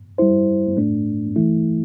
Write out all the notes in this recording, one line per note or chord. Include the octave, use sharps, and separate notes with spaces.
G3 E4 C5
A2 A3 D4
E3 A3 E4